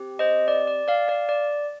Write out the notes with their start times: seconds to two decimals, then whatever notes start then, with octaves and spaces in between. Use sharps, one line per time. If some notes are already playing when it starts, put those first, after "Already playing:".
Already playing: C4 G4
0.19 C5 D#5
0.48 D5
0.67 D5
0.88 D5 F5
1.08 D5 F5
1.29 D5